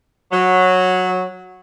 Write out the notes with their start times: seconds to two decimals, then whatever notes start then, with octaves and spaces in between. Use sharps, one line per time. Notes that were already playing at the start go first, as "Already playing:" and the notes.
0.32 F#3